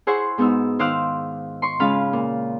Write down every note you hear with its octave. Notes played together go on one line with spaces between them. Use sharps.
E4 G#4 C5 F#5 C#6
G#2 B3 D#4 F#4 E6
D#3 C5 F5 D6 E6 F#6
C6 C#6
C#3 G#3 C#4 F4 F5 B5
A#2